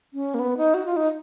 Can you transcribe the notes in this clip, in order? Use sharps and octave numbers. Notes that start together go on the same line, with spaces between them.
C#4
A#3
B3
D#4
F#4
F4
D#4